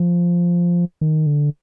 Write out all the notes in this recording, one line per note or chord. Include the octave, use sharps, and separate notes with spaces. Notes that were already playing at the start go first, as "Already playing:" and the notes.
Already playing: F3
D#3
D3